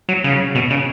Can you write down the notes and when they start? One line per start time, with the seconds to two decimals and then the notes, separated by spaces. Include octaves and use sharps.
0.09 F#3
0.24 C#3
0.55 B2
0.70 C#3